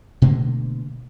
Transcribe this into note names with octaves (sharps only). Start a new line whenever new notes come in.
B2 D3 A3 A#3